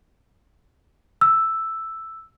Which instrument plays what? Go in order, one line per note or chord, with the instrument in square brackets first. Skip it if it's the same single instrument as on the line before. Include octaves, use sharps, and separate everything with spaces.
[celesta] E6